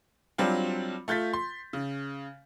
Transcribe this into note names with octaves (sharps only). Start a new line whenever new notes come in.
F#3 G3 C4 D4 F4
A3 F4 G6 A6 B6
C6
C#3